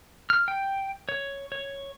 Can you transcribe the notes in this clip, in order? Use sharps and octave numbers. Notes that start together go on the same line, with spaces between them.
F6
G5
C#5
C#5